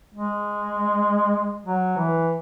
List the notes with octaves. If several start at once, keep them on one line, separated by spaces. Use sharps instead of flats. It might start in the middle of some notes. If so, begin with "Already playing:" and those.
G#3
F#3
E3